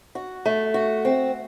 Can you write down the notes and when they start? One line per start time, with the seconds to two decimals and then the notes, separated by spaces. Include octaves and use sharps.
0.15 F#4
0.45 A3
0.74 F#4
1.05 C4